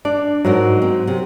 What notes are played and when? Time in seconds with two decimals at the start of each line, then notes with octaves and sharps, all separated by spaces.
0.05 D4 D5
0.45 G#2 F#3 F#4 A#4
0.82 C4
1.08 C3